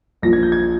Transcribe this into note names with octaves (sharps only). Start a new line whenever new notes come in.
A#1 A#2 F3 A#6
G#6
G6
G#6